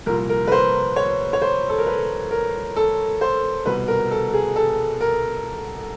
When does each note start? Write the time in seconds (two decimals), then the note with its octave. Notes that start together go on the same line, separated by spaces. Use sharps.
0.06 C2 A#2 F3 A#4
0.29 A#4
0.47 B4
0.52 C5
0.96 C#5
1.33 C#5
1.42 C5
1.69 A4
1.78 A#4
1.87 B4
2.31 A#4
2.76 A4
3.21 C5
3.66 C2 B2 B4
3.88 A#4
4.11 A4
4.33 G#4
4.56 A4
5.01 A#4